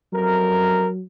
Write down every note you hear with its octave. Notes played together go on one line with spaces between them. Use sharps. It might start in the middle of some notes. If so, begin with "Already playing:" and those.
F2 F#3 A#4